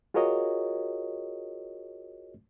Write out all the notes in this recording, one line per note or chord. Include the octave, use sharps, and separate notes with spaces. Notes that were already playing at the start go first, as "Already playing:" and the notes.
F4 F#4 G#4 A#4 C#5 D#5